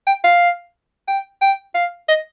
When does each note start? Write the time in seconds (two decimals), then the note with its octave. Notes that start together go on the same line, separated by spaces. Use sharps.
0.07 G5
0.24 F5
1.08 G5
1.41 G5
1.75 F5
2.08 D#5